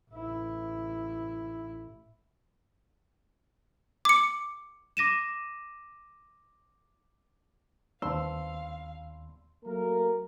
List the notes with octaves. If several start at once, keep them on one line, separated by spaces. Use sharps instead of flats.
A1 E4
D6 C#7
D6 A#6 D#7 E7
D#2 F5 C6 E6
F#3 A3 A#3 A#4